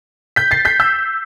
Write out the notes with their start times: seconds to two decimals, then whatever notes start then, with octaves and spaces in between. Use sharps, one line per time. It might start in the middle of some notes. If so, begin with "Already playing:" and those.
0.36 G6 B6
0.51 A6 C7
0.65 G6 B6
0.80 E6 G6